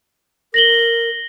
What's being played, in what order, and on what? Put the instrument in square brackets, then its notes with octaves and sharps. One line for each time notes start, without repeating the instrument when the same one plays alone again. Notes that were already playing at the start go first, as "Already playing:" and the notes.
[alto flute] A#4 [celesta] A#6 F#7 G7